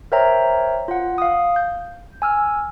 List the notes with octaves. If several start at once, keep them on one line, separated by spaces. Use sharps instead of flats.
A#4 C5 C#5 E5 G5 A#5
F4 F#5
F5 D#6
G6
G#5 E6 F6